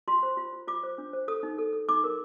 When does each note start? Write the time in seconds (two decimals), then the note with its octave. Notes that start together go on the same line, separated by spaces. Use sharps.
0.08 F4 C6
0.23 C5
0.37 F4
0.53 F4
0.67 F4 D6
0.83 C5
0.98 D4
1.13 C5
1.28 A4 D#6
1.43 D#4
1.58 A4
1.73 A4
1.89 D#4 D6
2.04 A#4